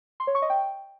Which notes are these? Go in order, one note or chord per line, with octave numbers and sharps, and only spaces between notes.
C6
C#5
C#6
D#5
G5